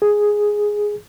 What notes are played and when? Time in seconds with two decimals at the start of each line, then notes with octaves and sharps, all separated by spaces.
0.02 G#4